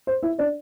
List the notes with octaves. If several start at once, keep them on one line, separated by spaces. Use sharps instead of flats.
C5
E4 E5
D4 D5